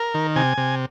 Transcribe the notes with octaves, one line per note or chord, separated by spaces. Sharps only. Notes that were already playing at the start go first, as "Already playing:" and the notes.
Already playing: A#4
D#3
C3 G#5
C3